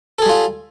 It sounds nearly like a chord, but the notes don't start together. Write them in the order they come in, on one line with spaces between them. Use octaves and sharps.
A4 G#4 G3 F4